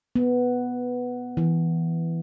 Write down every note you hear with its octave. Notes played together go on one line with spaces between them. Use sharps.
B3
E3